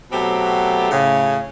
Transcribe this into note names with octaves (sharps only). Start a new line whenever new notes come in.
B2 F#3 A3 C4 G4
A2 C#3